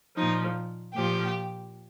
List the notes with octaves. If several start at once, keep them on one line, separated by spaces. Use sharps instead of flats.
A#2 F3 D#4
A#2 F3 G4